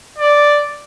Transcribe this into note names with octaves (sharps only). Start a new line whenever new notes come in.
D5